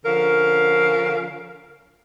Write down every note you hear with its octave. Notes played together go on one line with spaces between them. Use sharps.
D3 F3 C#4 A#4 F5